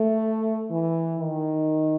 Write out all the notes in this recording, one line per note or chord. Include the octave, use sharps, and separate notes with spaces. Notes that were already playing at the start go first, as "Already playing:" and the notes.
Already playing: A3
E3
D#3